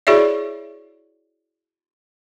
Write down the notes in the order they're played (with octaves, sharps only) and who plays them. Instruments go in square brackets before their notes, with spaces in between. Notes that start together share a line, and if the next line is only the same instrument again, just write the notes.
[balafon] E4 F#4 G#4 C#5 D5 E5